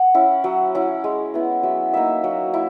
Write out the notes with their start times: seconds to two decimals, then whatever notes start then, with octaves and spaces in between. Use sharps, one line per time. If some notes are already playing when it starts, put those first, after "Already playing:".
Already playing: F#5
0.14 C#4 E4
0.44 F#3
0.75 C#4 E4
1.04 G#3
1.34 B3 E4
1.63 F#3 E5
1.93 A#3 D#4 E5
2.24 F#3
2.54 E4